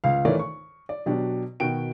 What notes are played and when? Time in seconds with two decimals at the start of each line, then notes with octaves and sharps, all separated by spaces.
0.04 C#2 F5
0.25 D#3 E3 A3 A#4 C#5 D5
0.39 C#6
0.89 D5
1.06 B2 F#3 D4 G4
1.60 B2 D#3 F#4 G5 D7